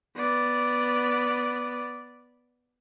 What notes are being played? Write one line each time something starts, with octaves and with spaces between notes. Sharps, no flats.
B3 D5